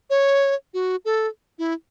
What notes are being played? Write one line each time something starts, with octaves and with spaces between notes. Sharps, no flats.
C#5
F#4
A4
E4